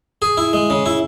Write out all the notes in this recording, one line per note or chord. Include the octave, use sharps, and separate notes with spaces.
G#4
E4
G#3
C#3
E4